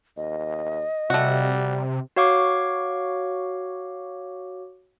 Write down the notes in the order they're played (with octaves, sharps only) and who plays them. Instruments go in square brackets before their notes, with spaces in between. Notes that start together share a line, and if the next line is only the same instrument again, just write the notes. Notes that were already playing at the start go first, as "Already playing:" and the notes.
[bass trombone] D#2 [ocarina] D#5
[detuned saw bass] C3 [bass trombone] G3 [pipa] A3 F#4
[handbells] F#4 C#5 F5 C#6 D6